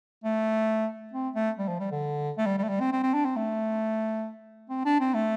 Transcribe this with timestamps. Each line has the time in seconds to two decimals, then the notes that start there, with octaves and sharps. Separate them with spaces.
0.24 A3
1.13 C4
1.35 A3
1.58 G3
1.68 F3
1.79 G3
1.91 D3
2.38 A3
2.46 G3
2.58 G3
2.63 A3
2.69 G3
2.80 C4
2.92 C4
3.03 C4
3.14 D4
3.25 C4
3.36 A3
4.70 C4
4.85 D4
5.00 C4
5.14 A3